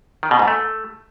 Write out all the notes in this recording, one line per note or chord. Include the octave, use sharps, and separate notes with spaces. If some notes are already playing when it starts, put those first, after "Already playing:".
D#3
B2
G#2
A3